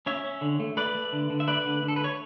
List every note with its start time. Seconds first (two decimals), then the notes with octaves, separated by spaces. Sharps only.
0.06 C#4 C#5 E5
0.24 C#4
0.41 D3
0.60 A3
0.77 A3 B4 D5
0.95 A3
1.13 D3
1.30 D3
1.40 E5
1.48 A3 B4 D5
1.66 D3
1.83 D3
1.88 A4
1.96 B4
2.01 A3 C#5